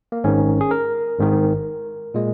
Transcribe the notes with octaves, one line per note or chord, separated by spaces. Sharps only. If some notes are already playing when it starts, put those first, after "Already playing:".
A#3
G#1 G#2 D#3 C#4
G#4
A#4
G#1 G#2 D#3
A#2 G#3